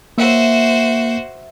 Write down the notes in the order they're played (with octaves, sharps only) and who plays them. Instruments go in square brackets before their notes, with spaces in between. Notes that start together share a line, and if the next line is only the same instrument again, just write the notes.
[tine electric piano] A#3 [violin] F#4 C5 [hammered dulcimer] E5